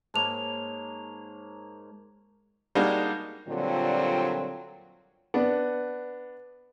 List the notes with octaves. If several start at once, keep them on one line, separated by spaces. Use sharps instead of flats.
G#2 A#3 C#5 A5 F7
G3 G#3 A#3 D4 D#4 F#4
A#2 D3 F#3 G3 C4 F4
B3 D4 F#5